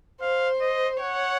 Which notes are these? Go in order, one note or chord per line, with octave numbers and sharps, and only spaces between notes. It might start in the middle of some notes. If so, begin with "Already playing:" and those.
C5 F5
D#5
C#5 F#5